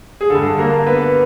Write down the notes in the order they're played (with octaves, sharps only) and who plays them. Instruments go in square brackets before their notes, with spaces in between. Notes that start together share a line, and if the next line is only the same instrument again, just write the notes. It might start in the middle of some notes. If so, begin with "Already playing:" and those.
[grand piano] G#4
D3 A4
G2
A#3 A#4
B3 B4